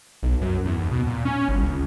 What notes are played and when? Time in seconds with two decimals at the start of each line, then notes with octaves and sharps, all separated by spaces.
0.23 B1
0.41 F#2
0.65 E2
0.78 D#2
0.91 B2
1.07 A#2
1.25 C#4
1.48 G1
1.62 C#2